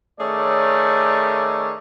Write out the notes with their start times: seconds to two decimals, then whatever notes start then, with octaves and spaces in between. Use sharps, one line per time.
0.20 D#3 A3 C#4 G#4 C#5 D5